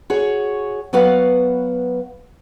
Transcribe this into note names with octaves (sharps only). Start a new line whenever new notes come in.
F#4 G#4 C#5
F#3 B3 F#4 B4 F5 F#5